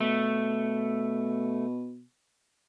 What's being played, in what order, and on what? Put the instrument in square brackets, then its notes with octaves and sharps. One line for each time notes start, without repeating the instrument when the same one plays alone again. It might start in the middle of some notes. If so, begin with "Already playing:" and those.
[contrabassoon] B2 [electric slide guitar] A3